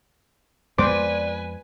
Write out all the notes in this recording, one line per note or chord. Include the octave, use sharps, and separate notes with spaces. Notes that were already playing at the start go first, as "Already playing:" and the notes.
F2 G#3 B3 B4 C5 D5 G#5 D6